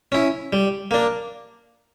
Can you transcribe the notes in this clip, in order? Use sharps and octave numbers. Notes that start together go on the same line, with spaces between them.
C#4 E4
G3
A#3 D4